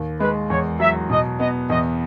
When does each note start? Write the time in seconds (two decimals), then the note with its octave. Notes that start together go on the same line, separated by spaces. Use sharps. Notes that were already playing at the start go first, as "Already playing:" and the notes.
Already playing: D#2
0.20 G#3 B4
0.50 E2 C#5
0.80 F#3 E5
1.10 B2 D#5
1.40 B3 D#5
1.70 E2 D#5